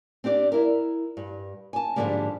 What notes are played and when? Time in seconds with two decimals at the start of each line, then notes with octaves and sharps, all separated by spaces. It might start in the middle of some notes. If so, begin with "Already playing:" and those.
0.24 C4 D4 G4 D5
0.52 E4 A#4
1.17 G2
1.73 G#5 A5
1.96 G#2 D3 D#3 F3 G3 A#3